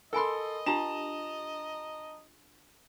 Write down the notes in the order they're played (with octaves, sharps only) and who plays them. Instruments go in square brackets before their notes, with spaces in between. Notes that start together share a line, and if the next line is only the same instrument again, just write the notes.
[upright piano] A4 C6 [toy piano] A#4 G#5 B5 [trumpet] D#5
[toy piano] D4 F4 G4 [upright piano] A5 A#5 E7